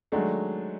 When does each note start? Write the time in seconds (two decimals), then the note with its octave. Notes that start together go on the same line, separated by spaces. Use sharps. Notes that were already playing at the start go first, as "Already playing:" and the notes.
0.12 D#3 F#3 G#3 A3 D4